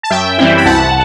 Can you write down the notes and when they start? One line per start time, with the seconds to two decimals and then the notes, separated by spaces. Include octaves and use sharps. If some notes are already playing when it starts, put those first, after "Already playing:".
0.03 A5
0.10 F#2 E5 G5
0.38 E3 G3 C4 E4
0.57 B5
0.65 C2 F#5 A5